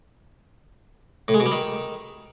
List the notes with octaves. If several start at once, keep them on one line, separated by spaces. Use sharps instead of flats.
A2
G#3
B2
G3
D#3